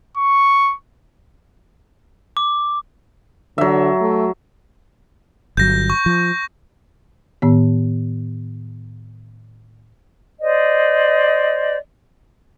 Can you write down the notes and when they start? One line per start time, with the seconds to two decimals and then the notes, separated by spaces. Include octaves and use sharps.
0.17 C#6
2.37 D6
3.58 D3 F#3 E5
4.01 A3
5.57 G1 F#3 G6 A#6
5.90 C#6
6.06 F3
7.42 A2 D#3 B3
10.41 C5 D5 D#5